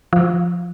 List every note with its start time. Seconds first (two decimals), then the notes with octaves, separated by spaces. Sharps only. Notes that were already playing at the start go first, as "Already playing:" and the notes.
0.13 F3